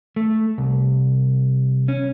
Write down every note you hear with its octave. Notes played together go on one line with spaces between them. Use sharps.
A3
C2
C#4